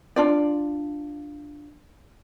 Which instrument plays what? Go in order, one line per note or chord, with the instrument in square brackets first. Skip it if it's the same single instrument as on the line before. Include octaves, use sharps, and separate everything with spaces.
[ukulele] D4 F4 D5